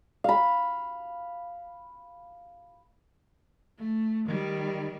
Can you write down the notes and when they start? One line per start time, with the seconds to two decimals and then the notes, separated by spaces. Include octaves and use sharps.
0.24 F5 B5
3.78 A3
4.25 D#3 G3